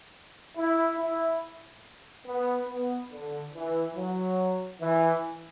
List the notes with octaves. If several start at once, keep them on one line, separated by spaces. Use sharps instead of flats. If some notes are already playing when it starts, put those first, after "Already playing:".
E4
E4
B3
B3
D3
E3
F#3
E3